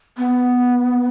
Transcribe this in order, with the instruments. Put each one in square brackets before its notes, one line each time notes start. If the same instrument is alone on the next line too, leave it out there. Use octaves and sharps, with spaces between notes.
[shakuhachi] B3